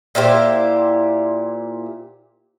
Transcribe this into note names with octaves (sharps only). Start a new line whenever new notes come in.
A#2 E4 G4 C5